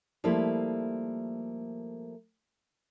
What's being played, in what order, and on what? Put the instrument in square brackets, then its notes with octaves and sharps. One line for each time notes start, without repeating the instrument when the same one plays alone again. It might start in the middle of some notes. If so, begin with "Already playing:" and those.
[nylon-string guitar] F3 G3 A3 A#3 E4